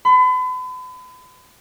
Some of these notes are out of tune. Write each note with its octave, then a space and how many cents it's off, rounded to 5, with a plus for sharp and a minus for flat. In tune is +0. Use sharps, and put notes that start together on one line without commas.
B5 +40